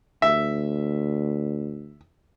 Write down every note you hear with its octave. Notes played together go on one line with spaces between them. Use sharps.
D2 E5